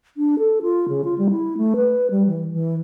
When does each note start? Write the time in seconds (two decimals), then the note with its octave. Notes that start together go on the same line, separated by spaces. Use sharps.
0.17 D4
0.39 A4
0.62 F4
0.88 C#3
1.04 F4
1.18 G3
1.30 E4
1.57 A3
1.76 B4
2.10 G3
2.27 E3
2.53 E3